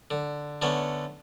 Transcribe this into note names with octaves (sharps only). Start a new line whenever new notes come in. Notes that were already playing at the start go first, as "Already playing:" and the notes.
D3
D3 A3 B3 C#4